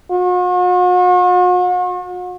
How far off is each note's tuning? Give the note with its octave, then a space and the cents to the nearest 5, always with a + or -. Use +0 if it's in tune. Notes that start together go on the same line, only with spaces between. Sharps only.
F#4 -45